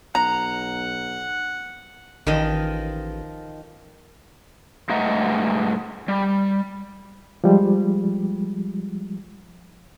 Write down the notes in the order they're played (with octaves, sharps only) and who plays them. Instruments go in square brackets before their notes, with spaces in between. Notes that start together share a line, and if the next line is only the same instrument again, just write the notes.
[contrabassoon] B1 [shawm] F#5 [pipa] A#5
[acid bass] A1 [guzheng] D#3 F3 D#5
[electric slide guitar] G2 G#3 A3 D#5 F#5 A#5
G3
[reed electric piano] F3 G3 G#3